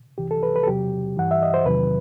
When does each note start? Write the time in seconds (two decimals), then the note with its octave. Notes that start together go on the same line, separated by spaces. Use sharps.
0.18 C2 C3 E3 G4
0.31 A4
0.43 B4
0.56 B4
0.63 A4
0.67 E2 C3 F#3 G4
1.17 G2 E3 F#5
1.31 E5
1.43 D#5
1.54 C5
1.66 E2 C3 D#3 F#3 B4